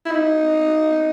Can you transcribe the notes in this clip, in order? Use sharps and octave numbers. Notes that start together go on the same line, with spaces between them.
E4
D#4